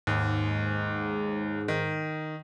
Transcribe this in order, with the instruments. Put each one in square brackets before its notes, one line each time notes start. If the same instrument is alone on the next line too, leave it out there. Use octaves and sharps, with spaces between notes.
[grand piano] D#2 [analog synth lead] G#2
[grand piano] D#3